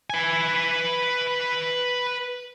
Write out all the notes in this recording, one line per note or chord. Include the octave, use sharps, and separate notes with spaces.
B4 G#5